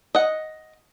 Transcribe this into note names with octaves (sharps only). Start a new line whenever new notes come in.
D#5 F#5